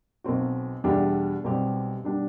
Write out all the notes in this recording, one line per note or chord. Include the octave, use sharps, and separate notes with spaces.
B1 B2 F#3 C4 F#4
E2 B2 G3 D4 G4
B1 B2 G3 C4 G4
B2 G3 D4